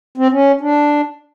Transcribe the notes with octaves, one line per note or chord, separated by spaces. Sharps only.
C4
C#4
D4